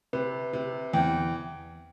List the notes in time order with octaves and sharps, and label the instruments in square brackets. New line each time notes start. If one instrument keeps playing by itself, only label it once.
[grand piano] C3 [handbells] B4
[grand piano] C3
[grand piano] E2 [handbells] G5